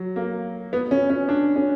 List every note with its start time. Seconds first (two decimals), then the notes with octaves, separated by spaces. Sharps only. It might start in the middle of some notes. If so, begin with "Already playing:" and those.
Already playing: F#3
0.16 A#3
0.73 B3
0.91 C#4
1.10 C#4
1.29 D4
1.56 C#4